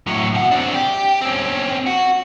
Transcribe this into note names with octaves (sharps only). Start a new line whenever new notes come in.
A2 F#3
B2 F#5
C4 D4
G4
C4 C#4
F#4